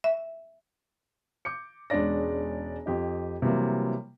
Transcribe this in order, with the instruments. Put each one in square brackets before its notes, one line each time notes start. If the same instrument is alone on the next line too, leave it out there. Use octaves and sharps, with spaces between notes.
[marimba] E5
[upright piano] D6 G6 C#7
E1 G#3 C#4 D4 D5 A#6
F2 G4 D#5
C3 E3 F#3 G3 A#3